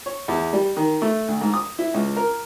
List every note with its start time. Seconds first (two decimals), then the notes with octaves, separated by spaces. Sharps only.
0.06 C#5
0.28 E2
0.53 G3
0.77 D#3
1.02 A3
1.28 D2
1.41 G#2
1.54 D#6
1.79 E4
1.94 C#2
2.16 A#4